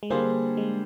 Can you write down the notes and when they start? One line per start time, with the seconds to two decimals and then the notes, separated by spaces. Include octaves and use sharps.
0.03 G#3
0.10 D3 G3 A#3 D4 G#4 C5
0.57 G#3